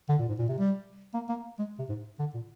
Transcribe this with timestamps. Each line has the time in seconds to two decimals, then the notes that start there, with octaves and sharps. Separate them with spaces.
0.09 D3
0.19 A#2
0.28 G#2
0.38 A#2
0.48 C3
0.59 G3
1.14 A#3
1.29 A#3
1.59 G#3
1.79 C3
1.89 G#2
2.19 D3
2.34 A#2